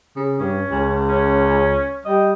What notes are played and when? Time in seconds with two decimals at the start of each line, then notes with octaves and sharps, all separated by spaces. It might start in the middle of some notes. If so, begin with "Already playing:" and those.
0.16 C#3
0.40 G2 C#4
0.71 C#2
1.09 C#4
2.06 G3 D#5